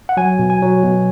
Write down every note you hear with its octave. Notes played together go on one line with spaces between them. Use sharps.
F#5
F#3 G#5
B2
G#5
F#3
B2